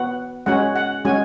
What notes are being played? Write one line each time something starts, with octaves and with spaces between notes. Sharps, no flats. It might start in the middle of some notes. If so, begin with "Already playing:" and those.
Already playing: B3 F#4 F#5
G#3 C#4 F#4 F#5
F#5
G#3 C#4 F#4 G#5